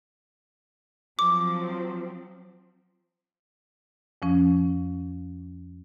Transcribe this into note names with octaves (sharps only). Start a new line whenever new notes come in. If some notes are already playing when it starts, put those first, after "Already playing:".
F3 F#3 C4 D6
F2 F3 C#4